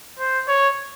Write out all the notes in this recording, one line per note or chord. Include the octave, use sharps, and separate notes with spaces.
C5
C#5